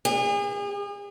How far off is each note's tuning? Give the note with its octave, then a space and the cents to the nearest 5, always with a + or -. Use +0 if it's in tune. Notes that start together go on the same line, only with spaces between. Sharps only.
G#4 -40